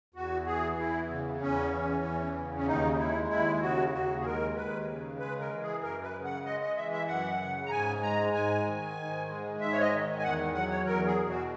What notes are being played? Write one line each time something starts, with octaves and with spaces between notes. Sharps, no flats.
E2 F#4
E3 G#4
E2 E4
C#3
E2 C#4
E3
E2
C#3
C#4
D#2 D#4
G#3 E4
D#2 E4
C#3 F#4
D#2 F#4
G#4
G#3 A#4
D#2 B4
C#3
G#3 B4
A#4
E3
G#4
F#2 A#4
B4
C#3
F#5
G#3 D#5
D#5
E3 E5
E5
F#2 F#5
C#3
A#5
G#2 G#5
G#3 A#5
G#2 G#5
D#3
G#2
G#3
G#2 E5
C#5
D#5
D#3
G#5
E2 F#5
F#3 F#5
C#5
E2 A#4
G#4
B2
F#4